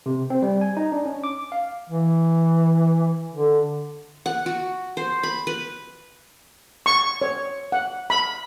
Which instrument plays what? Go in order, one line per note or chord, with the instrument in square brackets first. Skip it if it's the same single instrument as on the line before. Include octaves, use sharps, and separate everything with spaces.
[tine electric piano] C3
C4
G3
G#5
D#4
D4
C#4
D6
F5
[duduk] E3
D3
[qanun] F#5
F#4
C5
B5
B4
[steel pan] C#6
C#5
F#5
B5